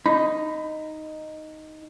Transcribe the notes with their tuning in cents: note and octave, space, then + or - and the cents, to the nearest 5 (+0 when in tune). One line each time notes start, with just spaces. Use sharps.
D#4 +0 B5 +20